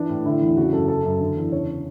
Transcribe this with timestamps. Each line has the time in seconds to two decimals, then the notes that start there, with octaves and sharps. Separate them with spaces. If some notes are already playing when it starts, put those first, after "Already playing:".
Already playing: E3 D4
0.09 A2
0.25 D3 E4
0.42 E2
0.57 C#3 F#4
0.73 F#2 A4
0.88 C#3 A4
1.04 F#2
1.20 D3
1.36 E2
1.52 C#3 C#5